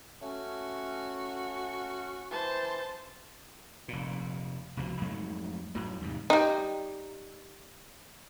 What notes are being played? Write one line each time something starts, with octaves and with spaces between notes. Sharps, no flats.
A3 C#4 F#4
E3 C5 A5
F1 A#2
F1 C#2 B2 F3
F2 G#2 F#3 A3
F#2 A2 F#3
E2 G#2 C3
G3 D#4